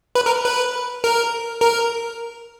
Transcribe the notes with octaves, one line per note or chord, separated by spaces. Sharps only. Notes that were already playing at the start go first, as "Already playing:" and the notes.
B4
A#4
B4
A#4
A#4